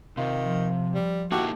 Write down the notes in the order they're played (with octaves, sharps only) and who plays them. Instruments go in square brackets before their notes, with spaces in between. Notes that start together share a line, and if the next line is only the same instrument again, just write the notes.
[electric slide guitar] C3 [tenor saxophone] D#3 [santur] F4
[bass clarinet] F3
[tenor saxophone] G3
[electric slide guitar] A#3 D#4 E4 [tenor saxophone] F#4 [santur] G4 A4